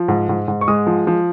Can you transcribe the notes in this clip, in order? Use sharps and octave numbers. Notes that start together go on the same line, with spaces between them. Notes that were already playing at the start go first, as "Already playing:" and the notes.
Already playing: F3
G#2
G#2
G#2
C#6
G#3 D#6
F3
F3